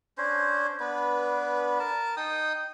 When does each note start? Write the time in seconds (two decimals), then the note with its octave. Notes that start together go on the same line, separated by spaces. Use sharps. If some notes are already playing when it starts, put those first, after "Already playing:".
0.18 C#4 D4 C5
0.80 B3 D4 B4
1.79 A#4 A5
2.17 D#4 G5 D#6